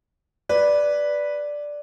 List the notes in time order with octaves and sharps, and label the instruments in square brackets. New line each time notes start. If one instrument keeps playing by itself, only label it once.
[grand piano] B4 [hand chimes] D5